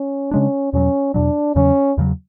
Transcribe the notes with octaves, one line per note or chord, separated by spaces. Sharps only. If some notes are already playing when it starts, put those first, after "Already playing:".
Already playing: C#4
C#3 G#3 C#4 D4
E2 B2 F#3 C#4
E2 B2 F#3 D4
E2 C#3 F#3 C#4
E2 C#3 F#3